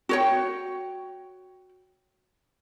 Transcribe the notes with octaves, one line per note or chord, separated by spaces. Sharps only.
F#4 C#5 G5